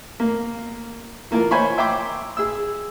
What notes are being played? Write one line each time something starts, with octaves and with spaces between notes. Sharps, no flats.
A#3
E3 A#3 F4 A#4
C5 C#5 G#5 A#5 B5 C#6
E5 G5 A#5 C6 D6
G#4 E6